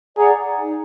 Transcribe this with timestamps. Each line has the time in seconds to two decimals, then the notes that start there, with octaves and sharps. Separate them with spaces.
0.17 G#4 D5 F#5 A#5
0.58 D#4